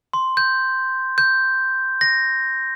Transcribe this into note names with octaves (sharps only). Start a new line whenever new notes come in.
C6
G6
G6
A#6